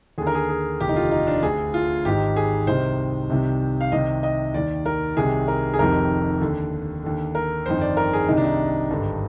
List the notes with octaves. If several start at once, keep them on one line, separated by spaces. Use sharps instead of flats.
D#2 D3 G#4
A#4
G#4
G#4
F1 D#2 D3 G4
D#4
F4
D#4
D4
D2 D3 G#4
F4
G#1 G#2 D#3 G4
G#4
C2 C3 D#3 C5
C2 C3 D#3
F5
C2 C3 D#3 D#5
D#5
D#2 D#3 D5
A#4
C2 C3 D#3 G#4
A#4
G#4
F1 F2 C3 D#3 A#4
D#2 D3
D#2 D3
A#4
G1 F2 D#3 C5
D5
A#4
G#4
C2 C3 D#3 D#4
D4
D#4
G#1 G2 D3